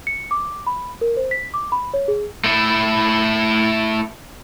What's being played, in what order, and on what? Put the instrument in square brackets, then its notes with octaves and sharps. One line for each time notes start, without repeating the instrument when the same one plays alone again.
[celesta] C#7
D6
B5
A#4
C5
B6
D6
B5
C#5
G#4
[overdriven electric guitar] A3 E4